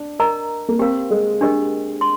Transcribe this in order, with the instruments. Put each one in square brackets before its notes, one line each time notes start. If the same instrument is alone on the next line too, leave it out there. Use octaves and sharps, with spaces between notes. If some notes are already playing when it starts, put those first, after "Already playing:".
Already playing: [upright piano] D4
[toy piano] A#4 D#5 A#5
[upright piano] A#3
[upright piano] C4 [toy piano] G4 A#4 F5
[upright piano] G#3
[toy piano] D4 G4 A#4 D#5
C6